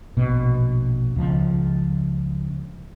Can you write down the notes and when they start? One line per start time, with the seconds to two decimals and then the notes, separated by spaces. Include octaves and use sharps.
0.17 A#1 B2
1.16 C#2 F3